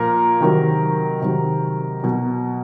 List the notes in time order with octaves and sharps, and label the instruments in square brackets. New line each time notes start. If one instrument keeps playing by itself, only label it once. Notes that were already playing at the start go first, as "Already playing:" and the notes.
Already playing: [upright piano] A#2 F3 A#4
C3 D#3 F#3
C3 D#3 F#3
B2 F#3